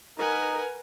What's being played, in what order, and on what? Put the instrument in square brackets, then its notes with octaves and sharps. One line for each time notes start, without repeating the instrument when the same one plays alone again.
[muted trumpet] D#4 [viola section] A#4 B4 [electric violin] F#5 G#5